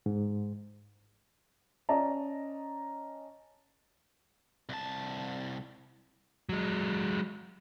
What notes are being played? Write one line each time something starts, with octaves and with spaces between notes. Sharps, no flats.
G#2
C#4 D5 D#5 A5 A#5
C2 A5
F#3 G#3